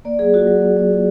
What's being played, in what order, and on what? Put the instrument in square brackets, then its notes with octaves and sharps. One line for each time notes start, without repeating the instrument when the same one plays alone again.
[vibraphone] A#3 D5
F#3 G#4
F4 F#4
F#3
A#3
F#3
F4